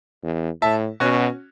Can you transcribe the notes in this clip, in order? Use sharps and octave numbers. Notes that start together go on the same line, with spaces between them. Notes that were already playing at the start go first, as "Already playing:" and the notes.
E2
A2 E5 A5
B2 C#4 F#4